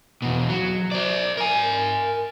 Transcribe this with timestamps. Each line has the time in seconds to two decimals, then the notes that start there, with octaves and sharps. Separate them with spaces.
0.22 E2 B2
0.49 F#3
0.91 C5 D5
1.37 A#4 G#5